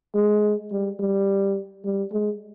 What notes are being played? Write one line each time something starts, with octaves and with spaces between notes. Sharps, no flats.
G#3
G3
G3
G3
G#3